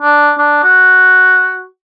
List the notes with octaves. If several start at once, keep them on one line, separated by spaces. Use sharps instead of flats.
D4
D4
F#4